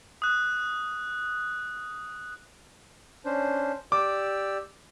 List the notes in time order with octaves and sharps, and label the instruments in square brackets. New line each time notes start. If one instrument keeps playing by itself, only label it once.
[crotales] D#6 F#6
[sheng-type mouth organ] C#4 D4 C5
[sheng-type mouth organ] G4 D5 E6 [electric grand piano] D6